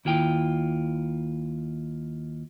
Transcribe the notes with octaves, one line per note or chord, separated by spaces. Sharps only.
D#2 E4 F4 G5